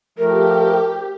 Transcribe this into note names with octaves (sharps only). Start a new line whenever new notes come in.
F3 A3 G4 A#4